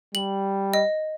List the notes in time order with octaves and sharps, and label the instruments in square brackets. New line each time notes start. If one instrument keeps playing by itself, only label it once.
[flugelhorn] G3 [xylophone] F#7
[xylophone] D#5